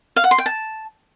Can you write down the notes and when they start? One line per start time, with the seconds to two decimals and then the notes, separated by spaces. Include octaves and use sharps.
0.16 F5
0.24 F#5
0.31 C6
0.38 G5
0.46 A5